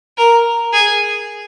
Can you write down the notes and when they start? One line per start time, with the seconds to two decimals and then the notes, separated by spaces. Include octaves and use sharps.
0.17 A#4
0.73 G#4